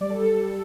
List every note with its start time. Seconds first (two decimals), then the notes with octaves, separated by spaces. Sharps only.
0.01 G3 D5
0.10 A4